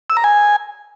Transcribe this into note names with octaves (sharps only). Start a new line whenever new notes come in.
E6
A#5
G#5